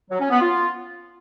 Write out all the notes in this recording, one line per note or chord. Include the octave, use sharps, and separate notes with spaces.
F#3
C#4
B3
F4